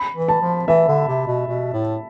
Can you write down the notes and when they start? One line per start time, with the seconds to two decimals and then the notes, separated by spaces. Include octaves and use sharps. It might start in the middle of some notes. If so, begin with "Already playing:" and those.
Already playing: B5
0.15 E3
0.28 A5
0.42 F3
0.67 E3 E5
0.88 D3
1.08 C3
1.27 B2
1.48 B2
1.74 A2